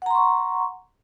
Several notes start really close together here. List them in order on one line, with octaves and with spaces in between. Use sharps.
F#5 A#5 C6 C#6